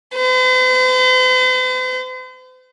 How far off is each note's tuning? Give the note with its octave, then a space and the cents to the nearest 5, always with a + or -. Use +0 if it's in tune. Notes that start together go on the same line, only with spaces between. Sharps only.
C5 -45